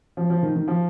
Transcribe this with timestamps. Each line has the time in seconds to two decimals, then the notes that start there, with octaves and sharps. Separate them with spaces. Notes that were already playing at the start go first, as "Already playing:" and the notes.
0.17 F3
0.30 F3
0.43 D#3
0.56 D#3
0.68 F3